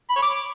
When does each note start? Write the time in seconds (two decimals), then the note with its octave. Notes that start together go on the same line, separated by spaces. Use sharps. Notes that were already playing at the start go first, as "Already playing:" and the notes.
0.10 B5
0.16 C#5
0.23 D6